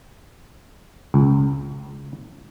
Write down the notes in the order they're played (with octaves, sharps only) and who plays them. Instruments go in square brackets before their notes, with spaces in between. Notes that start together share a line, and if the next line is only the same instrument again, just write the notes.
[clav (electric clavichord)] C#2